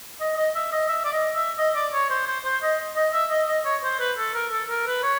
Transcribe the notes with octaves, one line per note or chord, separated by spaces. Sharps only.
D#5
D#5
E5
D#5
E5
D5
D#5
E5
D#5
D5
C#5
C5
C5
C5
D#5
D#5
E5
D#5
D#5
C#5
C5
B4
A4
A#4
A4
A#4
B4
C#5